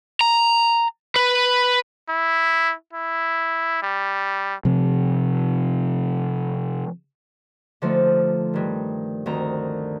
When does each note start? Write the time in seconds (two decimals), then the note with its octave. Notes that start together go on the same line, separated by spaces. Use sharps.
0.21 A#5
1.16 B4
2.09 E4
2.93 E4
3.82 G3
4.65 C3 F3 C4
7.82 D3 F3 A3 D#4
8.54 G2 D#3
9.26 D2 D#3 C4 A#5